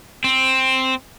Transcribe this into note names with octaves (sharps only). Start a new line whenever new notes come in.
C4